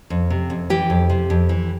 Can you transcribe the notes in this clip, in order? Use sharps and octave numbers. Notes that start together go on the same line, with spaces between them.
F2
C3
F2
E3 G4
F2
C3
F2
E3